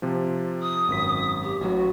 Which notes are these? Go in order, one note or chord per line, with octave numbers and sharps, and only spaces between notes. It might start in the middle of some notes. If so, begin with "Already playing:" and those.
C3 F3
D#6
G#1 F#2 B6
G4
A1 F#3 F#4